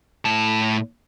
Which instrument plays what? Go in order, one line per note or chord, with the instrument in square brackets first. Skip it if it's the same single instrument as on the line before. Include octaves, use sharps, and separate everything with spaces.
[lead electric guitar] A2 A5